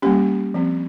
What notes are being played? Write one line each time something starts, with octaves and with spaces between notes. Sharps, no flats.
G3 A#3 C#4 G4
F3 C4